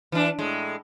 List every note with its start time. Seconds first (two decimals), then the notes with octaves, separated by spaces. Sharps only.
0.12 E3 D4
0.39 A2 G#3